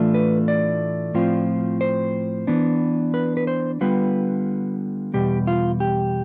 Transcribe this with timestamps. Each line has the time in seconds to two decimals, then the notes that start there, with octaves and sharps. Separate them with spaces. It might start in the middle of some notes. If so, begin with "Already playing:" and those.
Already playing: A2 E3 A3 D4 F4
0.14 B4
0.48 D5
1.14 A2 F3 C4 F4
1.81 C5
2.47 E3 B3 D4
3.14 B4
3.37 B4
3.47 C5
3.81 D3 G3 B3 F4 B4
5.14 E2 B2 G3 G4
5.47 F4
5.80 G4